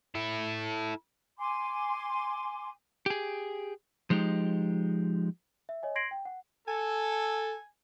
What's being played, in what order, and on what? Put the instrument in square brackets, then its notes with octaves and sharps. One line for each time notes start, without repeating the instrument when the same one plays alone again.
[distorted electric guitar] E4 A4
[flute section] G#5 C6 D6
[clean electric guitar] G4 G#4
F3 G#3 D#4 G4
[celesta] E5
C#5 D#5 G#5
C6 G#6 A#6 C7 D7 F#7
G5
F#5
[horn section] A4 [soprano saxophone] G#5